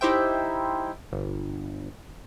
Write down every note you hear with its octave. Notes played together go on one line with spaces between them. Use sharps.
D#4 E4 G4 C5 E5 G5
G1